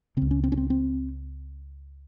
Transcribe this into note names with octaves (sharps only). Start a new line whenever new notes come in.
C#2 C#3 C4
C#4
C4
C#4
C4
C4